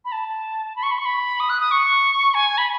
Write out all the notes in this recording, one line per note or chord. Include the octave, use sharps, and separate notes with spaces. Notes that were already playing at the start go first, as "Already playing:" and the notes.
B5
A5
B5
C#6
B5
C#6
B5
D#6
F#6
D#6
C#6
G#5
B5